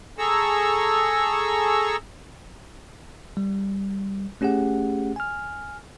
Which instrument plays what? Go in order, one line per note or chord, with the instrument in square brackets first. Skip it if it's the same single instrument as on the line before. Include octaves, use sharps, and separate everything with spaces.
[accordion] G#4 A4 A#5 C#6 E6
[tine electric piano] G3
A3 C#4 G4 G#4 F#5
G#5 F6